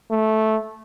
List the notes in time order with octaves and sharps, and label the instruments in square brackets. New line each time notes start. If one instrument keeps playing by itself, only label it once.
[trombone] A3